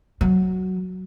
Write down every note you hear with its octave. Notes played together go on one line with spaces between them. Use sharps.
F#3